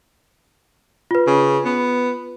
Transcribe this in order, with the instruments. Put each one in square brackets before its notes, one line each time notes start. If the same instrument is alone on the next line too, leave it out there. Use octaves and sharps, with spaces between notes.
[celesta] F4 B4
[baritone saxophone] C#3
B3